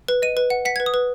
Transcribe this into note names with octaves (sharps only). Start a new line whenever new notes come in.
B4
D#5 D#7
B4
F#5
F#5 B6
B4 G#6
D#6
B4